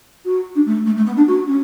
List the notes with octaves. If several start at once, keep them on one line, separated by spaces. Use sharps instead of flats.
F#4
D4
A3
A3
A3
B3
D4
F#4
C#4